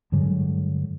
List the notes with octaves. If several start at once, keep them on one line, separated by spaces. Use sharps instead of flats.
G2 D3 F#3 G#3